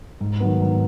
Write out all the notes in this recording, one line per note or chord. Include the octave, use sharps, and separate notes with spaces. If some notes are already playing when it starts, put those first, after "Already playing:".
G#2
D#3 F#3 B3
G#2